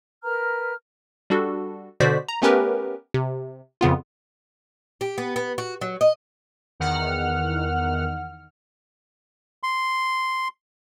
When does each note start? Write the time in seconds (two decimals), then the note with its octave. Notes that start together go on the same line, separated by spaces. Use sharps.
0.23 A#4 B4 A#5 F6
1.30 G3 D4 F#4 A4
2.00 B2 D3 F#4 C5 D5 B6
2.28 A#5
2.42 A3 B3 C#4 G4 A#4 B4
3.14 C3
3.81 F2 C#3 B3 F4
5.01 G4
5.18 B3
5.36 B3
5.58 F#4
5.81 F#3
6.01 D#5
6.80 E2 D#3 F#5 F6
9.63 C6